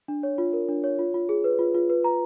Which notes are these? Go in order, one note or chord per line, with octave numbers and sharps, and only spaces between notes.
D4
C#5
F4
A#4
D4
C#5
F4
F4
G#4
B4
F4
F4
B4
A#5